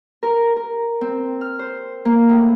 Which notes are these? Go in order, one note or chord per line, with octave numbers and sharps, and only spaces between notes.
A#4
A#4
C4
F6
C5
A#3
A2